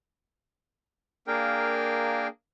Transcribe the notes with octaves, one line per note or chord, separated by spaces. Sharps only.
A#3 D4 G#4 A#4 F5 G5